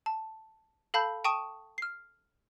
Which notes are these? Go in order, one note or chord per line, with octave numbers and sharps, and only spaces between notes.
A5
A4 F5 A5 B5 G6
G5 A5 C#6 D#6 D#7 E7
F6 C7